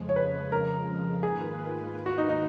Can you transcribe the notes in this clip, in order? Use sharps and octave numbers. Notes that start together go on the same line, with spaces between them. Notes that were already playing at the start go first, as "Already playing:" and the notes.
Already playing: F2 C#3 F3 G#3
C#5
B4
A#4
G#2 D#3 A#3 F4 G#4 B4
F#4
D#4
D#4